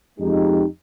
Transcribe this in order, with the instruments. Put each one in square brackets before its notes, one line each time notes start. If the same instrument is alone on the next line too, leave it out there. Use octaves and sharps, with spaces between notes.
[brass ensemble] F2 G#3 D#4 G4